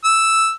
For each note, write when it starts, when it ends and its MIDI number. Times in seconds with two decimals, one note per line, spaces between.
0.04 0.52 88